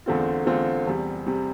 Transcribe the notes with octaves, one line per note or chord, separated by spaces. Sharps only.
E2 D3 A3 C4 F4
E2 D3 A3 C4 F4
E2 C3 G3
C3 G3